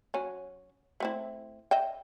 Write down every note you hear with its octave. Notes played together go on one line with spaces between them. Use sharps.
F#3 C#4
A3 C4 E4
D#5 E5 G5